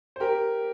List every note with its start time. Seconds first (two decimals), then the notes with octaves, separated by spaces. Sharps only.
0.16 C5
0.20 G4 A#4